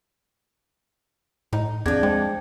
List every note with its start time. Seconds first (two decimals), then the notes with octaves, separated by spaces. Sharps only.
1.53 A2 D#4
1.86 E2 F3 C4 D4 G#4 G#6
2.03 G#3 C5 G5